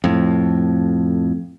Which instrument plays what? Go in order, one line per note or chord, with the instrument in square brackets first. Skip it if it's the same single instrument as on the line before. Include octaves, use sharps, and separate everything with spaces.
[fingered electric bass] F2 A2